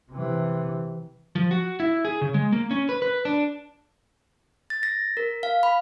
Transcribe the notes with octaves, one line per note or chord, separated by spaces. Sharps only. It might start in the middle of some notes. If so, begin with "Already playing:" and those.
C3 E3
F3
F#4
E4
G#4
C#3
G#3
A#3
C#4
B4
B4
D4
A6
A#6
A#4
F5
B5